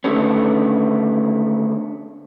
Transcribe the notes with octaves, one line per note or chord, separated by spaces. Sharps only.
D3 D#3 A3 B3 C#4